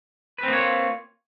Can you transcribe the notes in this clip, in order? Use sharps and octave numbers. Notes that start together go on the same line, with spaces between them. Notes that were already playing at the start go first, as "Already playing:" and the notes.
A#3 C4 F4 B4 C#5